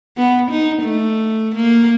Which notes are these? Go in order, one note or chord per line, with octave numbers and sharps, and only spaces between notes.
B3
D#4
A3
A#3